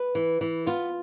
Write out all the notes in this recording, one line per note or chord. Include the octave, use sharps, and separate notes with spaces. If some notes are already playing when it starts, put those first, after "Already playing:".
Already playing: B4
E3
E3
B3 F4